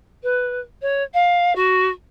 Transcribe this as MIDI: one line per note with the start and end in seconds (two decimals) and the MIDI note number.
0.23 0.60 71
0.82 1.03 73
1.14 1.55 77
1.55 1.88 66